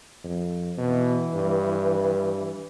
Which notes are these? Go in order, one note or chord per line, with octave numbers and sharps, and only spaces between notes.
F2
B2 E3
G2